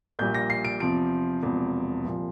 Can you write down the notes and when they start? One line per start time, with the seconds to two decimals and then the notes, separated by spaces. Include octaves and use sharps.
0.19 A#1 A#2 G3 G6
0.35 A#6
0.50 C7
0.65 D7
0.80 E2 C3 F3 D7
1.42 E1 E2 C3 F3
2.04 C2 A#2 F3